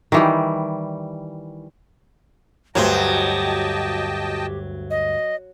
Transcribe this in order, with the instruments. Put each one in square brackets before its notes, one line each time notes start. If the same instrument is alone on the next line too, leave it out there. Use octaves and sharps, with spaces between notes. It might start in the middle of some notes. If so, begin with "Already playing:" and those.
[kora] D#3 E3 G3
[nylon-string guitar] D2 G2 C5 [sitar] F#3 [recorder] G4 [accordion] D#5 G5 A5
[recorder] D#5